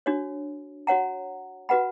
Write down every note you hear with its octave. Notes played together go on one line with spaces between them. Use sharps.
D4 F#4 C#5
F#4 C#5 F#5 A#5
F#4 B4 F#5 B5